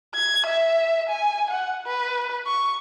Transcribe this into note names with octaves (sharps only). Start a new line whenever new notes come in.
G#6
E5
G#5
F#5
B4
C#6